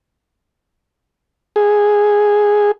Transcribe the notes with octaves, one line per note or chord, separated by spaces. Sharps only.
G#4